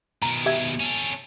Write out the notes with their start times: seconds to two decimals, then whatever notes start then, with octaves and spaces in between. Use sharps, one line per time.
0.22 B2 D#3 A#5
0.46 G4 E5 G#6
0.80 C#4 A4